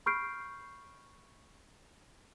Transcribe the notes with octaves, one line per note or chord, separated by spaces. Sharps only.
B5 C#6 F6 G6 C7 D7